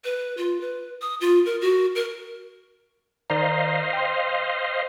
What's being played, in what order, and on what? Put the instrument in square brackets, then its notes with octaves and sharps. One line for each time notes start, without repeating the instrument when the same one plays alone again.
[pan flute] B4
F4
B4
D#6
F4
A#4
F#4
A#4
[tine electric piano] D#3 D5 A#5 [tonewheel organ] C5 D#5 F5
[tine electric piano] G5 C6